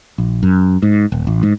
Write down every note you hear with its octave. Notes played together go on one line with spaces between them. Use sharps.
A#1
F#2
G#2
D#1
A1
G#2